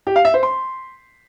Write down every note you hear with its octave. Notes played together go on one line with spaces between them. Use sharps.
G4
F5
E5
C5
C6